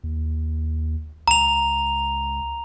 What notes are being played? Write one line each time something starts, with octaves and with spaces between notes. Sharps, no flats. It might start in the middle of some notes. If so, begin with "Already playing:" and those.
D#2
C#2 A#5 F7